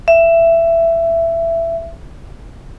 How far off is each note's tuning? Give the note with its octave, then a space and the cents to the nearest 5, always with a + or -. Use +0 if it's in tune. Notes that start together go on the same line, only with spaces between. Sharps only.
E5 +15